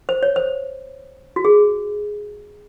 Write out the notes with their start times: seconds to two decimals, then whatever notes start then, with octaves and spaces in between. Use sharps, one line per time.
0.09 C5
0.23 C#5
0.36 C5
1.36 F#4
1.45 G#4